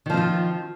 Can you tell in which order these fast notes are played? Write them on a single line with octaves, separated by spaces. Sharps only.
D#3 F3 C4 F4